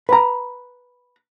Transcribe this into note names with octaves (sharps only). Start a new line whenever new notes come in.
B4 A#5